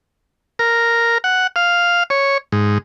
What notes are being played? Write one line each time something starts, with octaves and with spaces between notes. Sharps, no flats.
A#4
F#5
F5
C#5
G#2